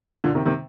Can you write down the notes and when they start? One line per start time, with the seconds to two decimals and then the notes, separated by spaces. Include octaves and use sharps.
0.24 A#2 D3
0.35 C3 D#3
0.45 C3 D#3